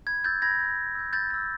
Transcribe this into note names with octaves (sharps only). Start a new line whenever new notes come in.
B5 G#6
E6 G6 A6
B5 G#6 A#6
E6 G6
B5
E6 G6
B5 G6 A6
E6 G6